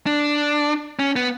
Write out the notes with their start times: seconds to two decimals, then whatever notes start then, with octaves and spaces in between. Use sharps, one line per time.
0.06 D4
0.99 C#4
1.16 B3